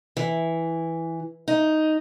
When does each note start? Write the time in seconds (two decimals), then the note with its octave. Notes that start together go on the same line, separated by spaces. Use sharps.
0.17 E3
1.48 D#4